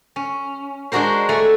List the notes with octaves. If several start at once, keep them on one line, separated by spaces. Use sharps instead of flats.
C#4
G#3 D4 F#4 A#4 C5
A3 F#5 G#5